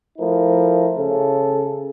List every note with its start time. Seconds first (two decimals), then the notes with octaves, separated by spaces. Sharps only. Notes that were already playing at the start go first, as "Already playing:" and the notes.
0.19 F3 A3 E4 A#4
0.97 C#3 A4